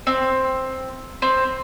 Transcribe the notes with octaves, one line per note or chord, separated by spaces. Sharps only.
C4
C4